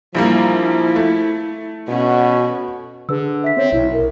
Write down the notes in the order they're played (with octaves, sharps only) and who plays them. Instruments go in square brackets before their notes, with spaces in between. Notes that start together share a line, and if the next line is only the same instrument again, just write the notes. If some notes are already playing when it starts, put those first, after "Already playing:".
[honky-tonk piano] A#1 G3 A#3 [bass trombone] F3 [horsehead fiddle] E4
[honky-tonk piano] A3
[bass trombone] B2 [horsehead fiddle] C#4 F#4
[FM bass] D3 [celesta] G#4 B4 E6
[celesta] E5 B6
[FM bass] C4 [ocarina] C#5
[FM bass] B1 [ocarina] E4
[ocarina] A#4